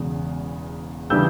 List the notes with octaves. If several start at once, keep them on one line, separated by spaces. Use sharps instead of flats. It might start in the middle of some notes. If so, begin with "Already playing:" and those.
Already playing: E1 E2 C#3
C#3 E3 G3 D4 E6 G6